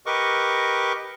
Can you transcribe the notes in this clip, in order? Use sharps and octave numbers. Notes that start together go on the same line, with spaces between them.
G4 A#4 B4 D#5 C#6 D6